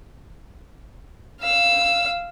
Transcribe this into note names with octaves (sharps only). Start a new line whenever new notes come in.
F5 E6